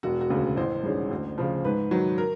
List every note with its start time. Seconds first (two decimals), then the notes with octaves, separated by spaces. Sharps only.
0.03 E1 F#4
0.21 F#4
0.30 D2 C#3
0.57 A1 C5
0.83 G2 D#3 G#3 C#4
1.11 D2
1.38 C#3 F3
1.65 G#2 B4
1.91 D#3 F#3
2.18 A#4